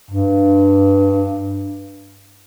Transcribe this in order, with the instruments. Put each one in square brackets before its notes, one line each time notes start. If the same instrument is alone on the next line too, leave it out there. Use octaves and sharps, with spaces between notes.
[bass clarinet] G2